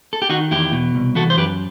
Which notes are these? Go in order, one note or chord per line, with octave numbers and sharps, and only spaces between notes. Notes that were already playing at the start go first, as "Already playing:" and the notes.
A4
G4
D#3 D#4 F#4
E2 E4 G4
B2
C2
E3 F#4 A4
C5
F#2 G4 B4